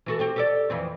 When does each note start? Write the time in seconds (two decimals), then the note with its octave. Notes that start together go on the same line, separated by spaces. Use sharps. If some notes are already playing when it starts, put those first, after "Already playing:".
0.06 E3 F#4 A4
0.19 C4 F#4 G4
0.36 G4 A4 D5
0.70 F2 E3 C4